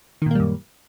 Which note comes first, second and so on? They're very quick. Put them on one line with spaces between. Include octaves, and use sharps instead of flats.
D#3 A#2 A#3 G3 F#2